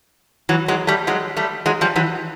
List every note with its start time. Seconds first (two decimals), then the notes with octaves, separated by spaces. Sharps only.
0.49 E3 F#3
0.68 F#3 G#3
0.87 G3 A3
1.07 F#3 G#3
1.37 G3 A3
1.66 F#3 G#3
1.81 F3 G3
1.96 E3 F#3